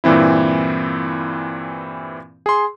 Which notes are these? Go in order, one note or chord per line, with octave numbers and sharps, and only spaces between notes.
G2 A#2 E3 C4 E4
G#4 C6